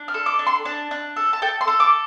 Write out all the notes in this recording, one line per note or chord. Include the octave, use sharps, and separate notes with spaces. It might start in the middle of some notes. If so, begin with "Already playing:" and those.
Already playing: D4
F6
A4
D6
D4
C6
D4 A5
D4
A4
A5
A4 G5
C6
A4
D6